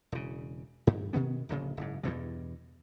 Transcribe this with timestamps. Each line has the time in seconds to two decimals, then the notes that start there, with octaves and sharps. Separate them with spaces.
0.12 E1 C#3
0.87 G2
1.13 B2 D#3 B3 C#4
1.49 D1 A#1 C#3
1.77 F#1 G#2
2.03 E2 G2 B2 E3